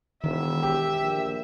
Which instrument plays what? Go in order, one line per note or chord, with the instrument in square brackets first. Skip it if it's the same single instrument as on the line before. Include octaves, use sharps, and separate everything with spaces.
[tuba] E1 [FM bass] D#3 [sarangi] E5
[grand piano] G4
[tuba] A#1